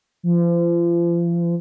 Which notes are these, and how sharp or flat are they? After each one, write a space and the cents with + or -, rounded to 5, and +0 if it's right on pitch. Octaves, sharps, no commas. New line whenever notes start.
F3 -35